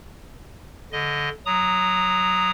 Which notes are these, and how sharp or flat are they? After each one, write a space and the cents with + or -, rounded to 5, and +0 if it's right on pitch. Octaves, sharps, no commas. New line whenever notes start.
D3 -20 D#5 +0
F#3 +0 A#5 +0 D#6 -10